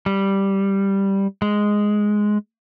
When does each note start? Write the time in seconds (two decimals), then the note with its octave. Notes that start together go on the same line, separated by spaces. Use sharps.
0.06 G3
1.42 G#3